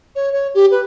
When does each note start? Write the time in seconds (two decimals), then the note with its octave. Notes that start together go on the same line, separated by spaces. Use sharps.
0.15 C#5
0.32 C#5
0.54 G4
0.71 B4